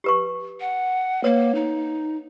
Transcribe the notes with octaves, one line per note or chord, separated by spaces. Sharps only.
G4 B4 C#6
F#5
A#3 B4 C#5
D#4